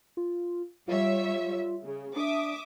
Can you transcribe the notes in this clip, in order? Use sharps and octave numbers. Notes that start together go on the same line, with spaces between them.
F4
G3 F4 C#5 E5
C#3
D4 E5 D6 D#6